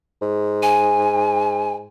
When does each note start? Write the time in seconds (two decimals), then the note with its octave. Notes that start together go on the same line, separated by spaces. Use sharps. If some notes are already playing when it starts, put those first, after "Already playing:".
0.22 G#2
0.63 G#5